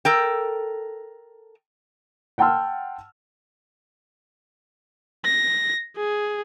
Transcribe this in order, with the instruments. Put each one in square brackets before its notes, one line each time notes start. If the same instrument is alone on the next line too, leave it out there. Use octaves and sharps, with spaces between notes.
[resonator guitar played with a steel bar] A4 A#4 G5
[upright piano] F#5 G5 A5 C6 E6 F6
[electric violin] A#6
G#4